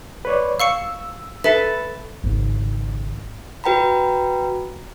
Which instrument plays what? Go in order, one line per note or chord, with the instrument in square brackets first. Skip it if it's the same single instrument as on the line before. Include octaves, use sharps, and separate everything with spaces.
[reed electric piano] B4 C#5 D5
[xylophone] F5 C#6 C#7 [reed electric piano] E6
[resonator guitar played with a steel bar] A4 B4 [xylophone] E5
[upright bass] G#1 C#3
[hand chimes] F#4 B4 G5 A#5 B5